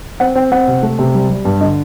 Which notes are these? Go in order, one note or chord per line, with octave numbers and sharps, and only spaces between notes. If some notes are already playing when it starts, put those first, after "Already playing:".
C4 F#5
C4 G5
C4 F#5
C3
A3
C3
G3
G3
G2
D3 D#5